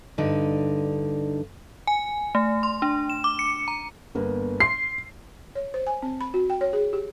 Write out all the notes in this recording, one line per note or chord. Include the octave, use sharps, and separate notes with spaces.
G2 D3 D#4
G#5
A3
C6
D4
E7
D6
C#7
A#5
G1 A#3 B3
C6 C7
C#5
C5
G#5
C4
B5
F#4
G5
C#5
G#4
G4